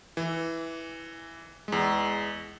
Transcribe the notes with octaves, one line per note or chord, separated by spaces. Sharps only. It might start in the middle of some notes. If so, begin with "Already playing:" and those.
E3
E2 G#3